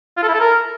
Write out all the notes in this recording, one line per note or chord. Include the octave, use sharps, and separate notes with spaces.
F4
A4
E4
A4
A#4